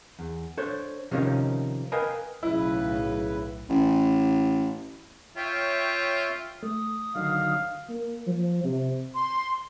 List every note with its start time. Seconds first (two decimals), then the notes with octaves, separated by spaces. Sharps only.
0.19 E2
0.57 D4 A4 C5 C#5
1.11 C3 D#3 F3 A#3 C#4 D#4
1.92 A#4 B4 D#5 F5 G5 G#5
2.43 B1 A2 C#3 E4 B4
3.69 A1
5.36 F4 C#5 E5 G5
6.63 A3 D#6
7.15 D3 D#3 F#3 F5
7.89 A#3
8.27 F3
8.64 C3
9.14 C6